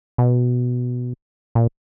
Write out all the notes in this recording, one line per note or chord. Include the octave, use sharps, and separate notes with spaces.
B2
A#2